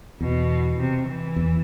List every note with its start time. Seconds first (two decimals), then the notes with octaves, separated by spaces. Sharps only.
0.20 E2 B2
0.78 C3
1.07 E3
1.36 E2